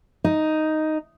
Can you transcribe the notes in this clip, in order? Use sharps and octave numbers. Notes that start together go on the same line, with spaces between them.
D#4